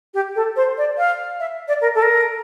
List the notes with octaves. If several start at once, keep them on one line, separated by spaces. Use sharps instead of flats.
G4
A4
C5
D5
F5
E5
D5
A#4
A4
A#4